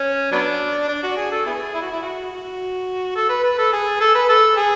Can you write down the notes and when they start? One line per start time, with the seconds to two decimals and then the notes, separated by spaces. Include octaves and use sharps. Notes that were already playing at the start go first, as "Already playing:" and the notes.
Already playing: C#4
0.32 F#3 B3 D4
0.88 D4
1.03 F#4
1.17 G#4
1.31 A4
1.46 B3 E4 G#4
1.74 E4
1.82 F#4
1.91 E4
2.02 F#4
2.30 F#4
3.16 A4
3.29 B4
3.43 B4
3.58 A4
3.73 G#4
4.00 A4
4.15 B4
4.29 A4
4.57 G#4